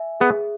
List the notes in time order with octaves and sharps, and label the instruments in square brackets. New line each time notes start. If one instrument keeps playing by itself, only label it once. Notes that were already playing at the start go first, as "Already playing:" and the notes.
Already playing: [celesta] E5 G#5
[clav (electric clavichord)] B3 [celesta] G#4